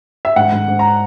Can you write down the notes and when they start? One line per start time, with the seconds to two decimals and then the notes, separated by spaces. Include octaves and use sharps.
0.25 E5
0.36 G#2 F#5
0.52 G#2
0.68 G#2
0.79 A#5